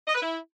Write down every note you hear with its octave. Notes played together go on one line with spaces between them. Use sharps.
D#5
B4
E4